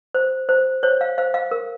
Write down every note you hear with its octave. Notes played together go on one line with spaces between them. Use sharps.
C5
C5
C5 C#5
F5
C5 F5
F5
A#4